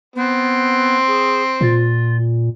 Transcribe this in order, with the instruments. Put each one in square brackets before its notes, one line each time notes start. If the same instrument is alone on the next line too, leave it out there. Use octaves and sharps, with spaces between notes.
[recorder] B3 [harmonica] C4
[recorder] G#4
[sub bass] A#2 [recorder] F4